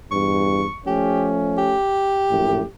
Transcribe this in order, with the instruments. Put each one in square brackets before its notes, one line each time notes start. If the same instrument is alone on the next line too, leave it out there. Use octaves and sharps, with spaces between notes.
[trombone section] E2 G2 [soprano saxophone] C#6
[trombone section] F3 A3 C#4 [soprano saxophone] G4
[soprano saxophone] G4
[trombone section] A#1 F#2 A2